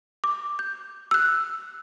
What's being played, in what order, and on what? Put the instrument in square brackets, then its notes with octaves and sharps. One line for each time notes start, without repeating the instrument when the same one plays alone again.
[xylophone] D6
G6
E6 F#6